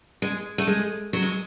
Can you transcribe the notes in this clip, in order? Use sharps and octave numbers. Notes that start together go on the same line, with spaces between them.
G#3
A3
G#3
F#3
G#3